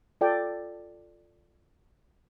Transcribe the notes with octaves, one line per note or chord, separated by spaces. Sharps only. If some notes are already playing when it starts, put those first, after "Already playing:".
F4 A4 D5 G5